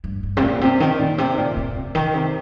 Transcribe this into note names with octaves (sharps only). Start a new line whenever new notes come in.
G2
G2
C3
A#2
C3
D#3
A#2
C3
A#2
A#2
C3
D#3
C3